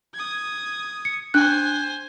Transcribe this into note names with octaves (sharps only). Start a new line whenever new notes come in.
D#6 G#6
C#7
D4 C5 G#5 F#6